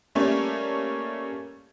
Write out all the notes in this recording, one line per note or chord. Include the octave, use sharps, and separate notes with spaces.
G3 A3 A#3 C#4 C#5 D5